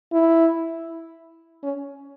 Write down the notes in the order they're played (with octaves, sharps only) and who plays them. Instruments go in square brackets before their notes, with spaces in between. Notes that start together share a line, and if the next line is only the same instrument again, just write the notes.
[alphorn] E4
C#4